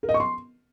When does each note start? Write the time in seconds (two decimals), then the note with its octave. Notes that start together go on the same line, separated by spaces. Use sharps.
0.03 A#4
0.09 D#5
0.14 C#6
0.20 C6